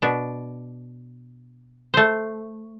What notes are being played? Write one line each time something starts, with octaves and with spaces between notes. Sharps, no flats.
B2 D4
A3 C5